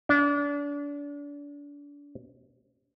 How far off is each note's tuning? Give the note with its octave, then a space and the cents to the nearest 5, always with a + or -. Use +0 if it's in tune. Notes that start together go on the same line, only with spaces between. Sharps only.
D4 -35